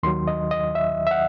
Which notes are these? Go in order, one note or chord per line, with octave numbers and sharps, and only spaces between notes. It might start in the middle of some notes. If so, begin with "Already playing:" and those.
D#2 D#3 F#3 C6
D#5
D#5
E5
E5
F#5